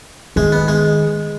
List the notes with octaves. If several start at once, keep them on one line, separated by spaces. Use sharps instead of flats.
D#3 G#3
B3
G#3